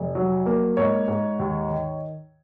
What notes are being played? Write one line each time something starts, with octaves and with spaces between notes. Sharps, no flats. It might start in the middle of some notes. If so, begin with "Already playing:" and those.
Already playing: F1
F#3
A#3
G#2 C#5
G#2
D#2
D#3